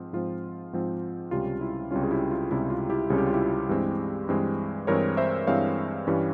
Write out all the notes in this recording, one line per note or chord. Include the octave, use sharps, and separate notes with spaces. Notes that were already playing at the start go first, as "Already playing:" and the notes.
Already playing: G#2 F3 C4
G#2 F3 C4 F4
G#2 F3 C4
C#2 C3 G3 C#4 F4
E4
C#2 C3 G3 C#4 F4
G#4
E4 G4
F4
C#2 C3 G3 C#4 E4
F4
E4 G4
C#2 C3 G3 C#4 G#4
G4
F4
E4 G4
G2 E3 G#3 C4
G2 E3 G#3 C4
G2 E3 G#3 C4 A#4 C#5
C5 E5
G2 E3 G#3 C4 C#5 F5
G2 E3 G3 C#4